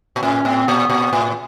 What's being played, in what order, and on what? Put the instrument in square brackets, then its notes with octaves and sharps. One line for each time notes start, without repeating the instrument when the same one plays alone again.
[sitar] A#2
[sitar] A2 [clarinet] C#4
[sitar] A2 [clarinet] C4
[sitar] A#2 [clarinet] B3
[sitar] A#2 [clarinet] B3
[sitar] A2